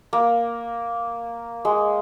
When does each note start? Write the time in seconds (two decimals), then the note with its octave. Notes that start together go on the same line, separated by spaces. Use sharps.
0.13 A#3
1.65 G#3